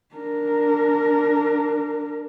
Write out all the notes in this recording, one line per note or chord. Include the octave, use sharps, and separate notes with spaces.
D4 A#4